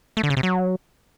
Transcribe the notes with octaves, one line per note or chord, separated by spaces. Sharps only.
A3
D3
C#3
C3
F#3